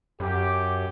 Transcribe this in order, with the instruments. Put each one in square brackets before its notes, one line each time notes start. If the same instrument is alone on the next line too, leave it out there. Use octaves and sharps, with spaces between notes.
[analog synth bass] F#2 [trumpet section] G4